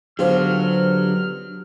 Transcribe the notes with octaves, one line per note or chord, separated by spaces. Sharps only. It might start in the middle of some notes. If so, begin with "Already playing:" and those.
D3 F#3 B3 F4 G4 C5 F6